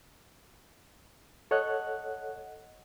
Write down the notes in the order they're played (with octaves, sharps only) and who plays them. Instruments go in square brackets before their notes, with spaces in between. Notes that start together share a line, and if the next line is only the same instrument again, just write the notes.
[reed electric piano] A4 C#5 D#5 F#5 F#6